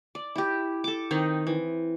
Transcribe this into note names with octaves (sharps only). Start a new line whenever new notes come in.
D5
E4 G4
A4 D6
D#3 C4 D#4
E3